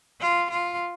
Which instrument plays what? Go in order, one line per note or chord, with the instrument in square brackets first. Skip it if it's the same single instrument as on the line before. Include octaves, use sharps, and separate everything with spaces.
[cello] F4
F4